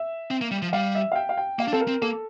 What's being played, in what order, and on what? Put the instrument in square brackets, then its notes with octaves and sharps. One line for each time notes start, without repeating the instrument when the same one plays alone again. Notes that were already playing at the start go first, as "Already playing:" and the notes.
Already playing: [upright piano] E5
[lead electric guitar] C4
A#3
G3
F3
[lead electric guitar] G3 [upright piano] F5
[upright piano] E5
F5
G5
F5
G5
[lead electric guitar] A#3 [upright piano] F5
[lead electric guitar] D4
[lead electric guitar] C4 [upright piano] A4
[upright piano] A#4
[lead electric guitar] C4
[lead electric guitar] A#3 [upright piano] A4